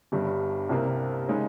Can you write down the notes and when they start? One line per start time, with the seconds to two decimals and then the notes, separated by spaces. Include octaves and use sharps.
0.12 G1 G2 G3
0.69 C2 C3 G3 A#3
1.28 C#3 G#3 D#4